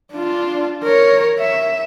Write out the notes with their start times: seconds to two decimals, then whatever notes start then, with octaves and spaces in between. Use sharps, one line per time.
0.12 D4 F4
0.84 A#4 C#5
1.39 E5